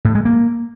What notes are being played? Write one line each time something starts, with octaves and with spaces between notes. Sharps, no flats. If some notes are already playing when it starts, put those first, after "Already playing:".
A2
G#3
A#3